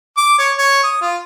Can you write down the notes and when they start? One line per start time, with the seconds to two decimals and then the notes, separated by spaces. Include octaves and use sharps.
0.17 D6
0.39 C#5
0.58 C#5
0.84 D#6
1.01 F4